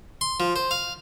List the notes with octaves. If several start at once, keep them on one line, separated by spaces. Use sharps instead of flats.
C6
F3
C5
F5